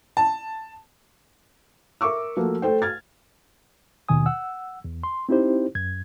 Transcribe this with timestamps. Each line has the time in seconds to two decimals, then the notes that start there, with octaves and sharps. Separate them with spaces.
0.17 A5
2.01 A#4 E5 C#6 D6 E6
2.37 F3 A3 A#3 F#4
2.62 A3 A4 C5 G5
2.82 F6 G#6 A6
4.09 D#2 B2 D#3 G#5 D#6
4.26 F#5 E6
4.85 E2
5.03 C6
5.29 C4 D#4 E4 G4 C5
5.75 F#2 G#6